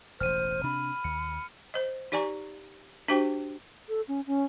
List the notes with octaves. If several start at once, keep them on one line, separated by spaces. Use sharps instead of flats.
E1 A1 C5 F6 D#7
C3 D4 B5
D#2 C#7
C5 D#5
D#4 G4 D5 G#5 A#5 C#6
D4 F#4 G4 C5 G5 C#6
A4
C#4
C#4